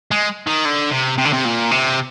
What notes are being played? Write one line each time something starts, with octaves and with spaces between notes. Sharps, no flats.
G#3
D#3
D3
C3
C3
D3
C3
A#2
C3